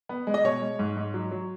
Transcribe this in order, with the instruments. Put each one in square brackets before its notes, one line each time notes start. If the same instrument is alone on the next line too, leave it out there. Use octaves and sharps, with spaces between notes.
[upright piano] B3
G#3
D#5
B2 C#5
G#3
G#2
G#2
F#3
F#3